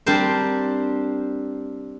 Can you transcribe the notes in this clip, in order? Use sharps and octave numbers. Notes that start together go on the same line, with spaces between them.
G3 C4 D4 G4 A#4 C5